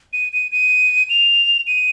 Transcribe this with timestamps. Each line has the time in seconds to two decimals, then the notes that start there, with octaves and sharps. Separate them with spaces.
0.13 D#7
0.33 D#7
0.52 D#7
1.10 F7
1.67 D#7